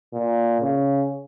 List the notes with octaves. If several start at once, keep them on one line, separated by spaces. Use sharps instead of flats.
A#2
C#3